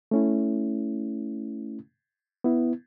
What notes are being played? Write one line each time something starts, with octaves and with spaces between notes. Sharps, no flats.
A3 C#4 E4
B3 E4